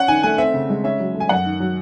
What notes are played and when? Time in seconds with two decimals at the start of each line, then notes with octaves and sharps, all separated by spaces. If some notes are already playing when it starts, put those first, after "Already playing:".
Already playing: C#4 F#5
0.08 D#3 G#5
0.23 A3 G#5
0.38 C4 E5
0.54 C#3
0.70 G#3
0.84 C#4 E5
1.00 F#3
1.14 A3
1.20 G#5
1.29 F#2 F#5
1.45 D#3
1.60 F#3